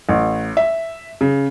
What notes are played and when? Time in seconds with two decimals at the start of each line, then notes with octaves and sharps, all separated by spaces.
0.09 A1
0.57 E5
1.21 C#3